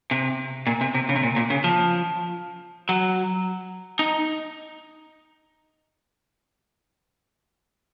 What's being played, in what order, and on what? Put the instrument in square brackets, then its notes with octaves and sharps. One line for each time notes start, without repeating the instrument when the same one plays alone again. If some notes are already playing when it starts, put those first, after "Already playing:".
[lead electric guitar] C3
A#2
C3
C3
C#3
C3
A#2
A#2
C#3
F3
F#3
D#4